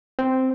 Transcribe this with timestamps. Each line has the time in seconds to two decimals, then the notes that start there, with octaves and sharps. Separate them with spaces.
0.19 C4